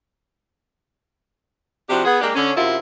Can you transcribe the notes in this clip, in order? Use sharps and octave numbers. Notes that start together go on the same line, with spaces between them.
C3 F3 D4 F#4 G4
B3 G#4
G#3 A#3 D4 G4
D3 C#4
F#2 C3 E4 F4